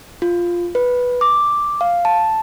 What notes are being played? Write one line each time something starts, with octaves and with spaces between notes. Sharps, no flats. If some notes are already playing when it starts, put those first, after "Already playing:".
F4
B4
D6
F5
A5